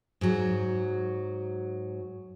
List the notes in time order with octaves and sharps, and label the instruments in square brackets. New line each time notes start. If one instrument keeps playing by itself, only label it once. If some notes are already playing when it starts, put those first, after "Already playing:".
[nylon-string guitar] G#2 F#3